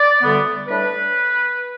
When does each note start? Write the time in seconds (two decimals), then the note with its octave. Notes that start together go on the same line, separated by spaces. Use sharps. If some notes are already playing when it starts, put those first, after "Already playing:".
Already playing: D5
0.22 D2 D3 G3 B3
0.68 A2 G3 D4 B4